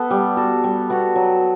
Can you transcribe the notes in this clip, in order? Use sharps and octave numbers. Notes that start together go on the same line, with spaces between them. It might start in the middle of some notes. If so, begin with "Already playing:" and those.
Already playing: B3 A4
G3
B3 F#4 A4
G3
B3 F#4 A4
F#3